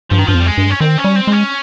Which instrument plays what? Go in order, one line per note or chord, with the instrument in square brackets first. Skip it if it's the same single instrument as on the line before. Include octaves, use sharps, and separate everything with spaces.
[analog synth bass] G2 [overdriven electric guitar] F3
[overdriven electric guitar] D#3
[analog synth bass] G2 [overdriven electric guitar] F3
[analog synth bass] F2
[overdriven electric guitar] G3
G#3
[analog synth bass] G2
[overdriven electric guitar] C#4
[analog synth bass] D#3 [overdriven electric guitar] C4
[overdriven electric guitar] C#4
[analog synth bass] G3
[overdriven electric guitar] C4
[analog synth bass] G#3
[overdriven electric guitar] C#4